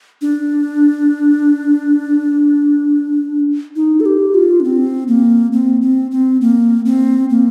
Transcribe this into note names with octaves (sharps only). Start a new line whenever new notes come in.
D4
D#4
A4
G4
F4
D4
C4
A#3
C4
C4
C4
A#3
C4
A#3